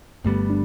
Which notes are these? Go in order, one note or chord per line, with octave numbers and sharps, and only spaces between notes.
G1 G2 G3 A3 B3
D4